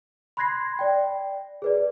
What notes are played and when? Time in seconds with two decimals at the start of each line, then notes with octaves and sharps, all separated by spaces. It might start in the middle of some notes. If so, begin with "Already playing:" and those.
0.37 B5 C6 F#6 G#6 A#6 C7
0.79 D5 G5
1.62 G#4 B4 D5